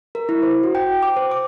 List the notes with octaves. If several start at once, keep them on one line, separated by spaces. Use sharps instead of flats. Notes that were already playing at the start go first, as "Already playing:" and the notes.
A#4
E4
C5
F#4
G5
D6
C5
D6